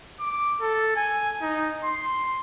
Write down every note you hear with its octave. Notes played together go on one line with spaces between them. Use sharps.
D6
A4
G#5
D#4
C6